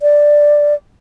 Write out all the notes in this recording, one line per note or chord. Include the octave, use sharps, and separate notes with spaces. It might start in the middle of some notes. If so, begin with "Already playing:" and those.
D5